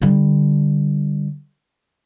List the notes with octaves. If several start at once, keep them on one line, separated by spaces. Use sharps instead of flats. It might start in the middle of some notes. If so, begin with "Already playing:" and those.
D3 G3